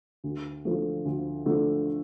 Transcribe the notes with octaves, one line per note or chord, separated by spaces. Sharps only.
D2
D3 F3 A3
D2
D3 F3 A3